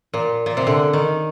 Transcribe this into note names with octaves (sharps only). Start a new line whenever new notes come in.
A#2
A#2
C3
D3
D#3